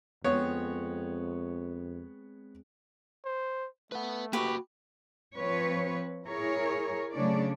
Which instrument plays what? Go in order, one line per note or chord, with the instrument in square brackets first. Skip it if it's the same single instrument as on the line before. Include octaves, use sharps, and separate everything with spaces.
[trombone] F2 [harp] G#3 C4 [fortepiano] B3 C#5
[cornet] C5
[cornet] A3 [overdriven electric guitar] B4 F#5
[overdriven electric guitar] A#3 F#4 [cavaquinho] G4 B4 C#6
[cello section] F3 C4 B4 C#5
E4 G#4 A#4 C#5
C#3 F#3 A3 D4 C#5 D5